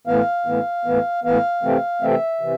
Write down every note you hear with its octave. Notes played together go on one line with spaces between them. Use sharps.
A2 E3 B3 F5
A2 E3 B3
A2 E3 B3
A2 E3 B3 F5
C3 E3 A3 C4
C3 E3 A3 C4 E5
C3 E3